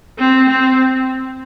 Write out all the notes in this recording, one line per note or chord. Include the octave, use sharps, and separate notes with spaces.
C4
C4